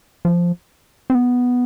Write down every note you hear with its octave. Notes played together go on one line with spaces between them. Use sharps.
F3
C4
B3